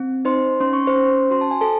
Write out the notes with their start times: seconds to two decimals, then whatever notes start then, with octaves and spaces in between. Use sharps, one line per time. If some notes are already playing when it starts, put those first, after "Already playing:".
Already playing: C4
0.25 D#4 C5 C6
0.60 C#4 C6
0.73 C#6
0.87 C5 C6
0.96 C#4
1.31 F#4 C6
1.41 A5
1.51 G#5
1.61 A4 A5